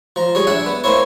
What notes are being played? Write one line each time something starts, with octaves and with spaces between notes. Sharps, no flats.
F3 A#5
G3 G#4 C#5
D4 E5 F#5 G#5
B3
A#3 C4 E4 C#5